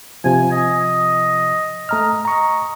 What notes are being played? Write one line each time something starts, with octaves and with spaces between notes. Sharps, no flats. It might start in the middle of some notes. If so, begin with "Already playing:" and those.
C3 F3 G#5
D#5
A3 D#5 A#5 F6
D#5 A#5 C#6